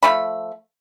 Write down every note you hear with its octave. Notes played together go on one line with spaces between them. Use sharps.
F3 A3 B5